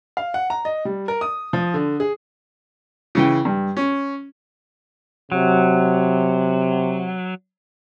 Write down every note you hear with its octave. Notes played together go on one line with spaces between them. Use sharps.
F5
F#5
A#5
D#5
G3
A#4
D#6
F3
D3
G#4
C#3 E3 G5
G2
C#4
C3 F#3